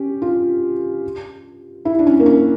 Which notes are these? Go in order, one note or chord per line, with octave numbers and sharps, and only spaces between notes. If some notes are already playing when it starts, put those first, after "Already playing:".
Already playing: C#4 G4
F4
E4
D4
C#4
A#3
C#4